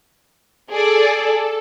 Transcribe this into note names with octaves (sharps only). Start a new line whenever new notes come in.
G#4 A4 D5